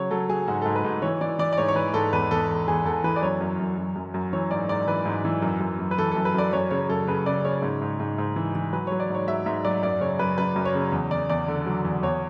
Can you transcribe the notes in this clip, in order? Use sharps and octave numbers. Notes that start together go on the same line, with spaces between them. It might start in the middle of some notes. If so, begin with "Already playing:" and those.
Already playing: C#3 F#3 C#5
F#3 A4
F#3 G#4
G#2 F#4
G#2 A4
B4
G#2
E3 C#5
E3 D5
E3 D5
D5
G#2 C#5
C#5
E3 B4
G#2 A4
E2 B4
E2 A4
E2
E2 G#4
E2 A4
E3 B4
D5
F#2 C#5
F#2
F#2
F#2
F#2
F#2
E3 C#5
G#2 D5
G#2 D5
E3 B4
G#2
E3
F#2
F#2
F#2
B4
E3 A4
F#2 A4
B4
F#2 D5
F#2 C#5
C#3 C#5
F#2 A4
C#3 B4
C#3 D5
C#3 C#5
G#2
G#2
G#2
G#2
E3
E3
F#3 B4
F#3 C#5
D5
G#2 C#5
F#3 E5
G#2 E5
F#3 D5
F#2 D5
C#3 C#5
F#2 B4
F#2 B4
F#2
C#5
C#3
E2
E2 D5
E2 D5
D3
F#3
E2
E2 C#5